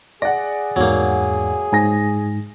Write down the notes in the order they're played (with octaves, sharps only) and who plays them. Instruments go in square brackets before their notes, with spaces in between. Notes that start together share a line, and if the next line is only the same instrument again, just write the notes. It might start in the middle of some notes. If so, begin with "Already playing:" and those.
[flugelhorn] G#4 [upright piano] D5 F#5 [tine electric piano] A#6
[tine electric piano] E2 G#2 [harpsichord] F#3 A#3
[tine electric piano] G#2 [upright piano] G#5 A#6